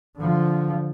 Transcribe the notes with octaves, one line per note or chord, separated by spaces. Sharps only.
D3 F3